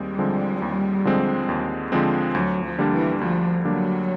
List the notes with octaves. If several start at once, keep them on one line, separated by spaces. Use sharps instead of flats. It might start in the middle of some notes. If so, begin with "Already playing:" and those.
Already playing: D#2 G3 G#3 C4
D3 F3 G#3 C4
D#2
D3 F3 G#3 C4
D#2
D3 F3 G#3 C4
D2 F#3
F3
D3 G3 A#3 D4
E3
D2 F3
D3 F#3 G3 A#3 D4